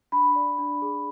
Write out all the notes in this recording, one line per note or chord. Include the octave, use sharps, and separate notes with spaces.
D4 B5
D5
D4
G#4